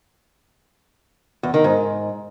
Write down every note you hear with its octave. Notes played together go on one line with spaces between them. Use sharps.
E2
D#3
G#2